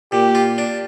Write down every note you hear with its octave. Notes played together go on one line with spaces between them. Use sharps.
A#2 G4
F4
D4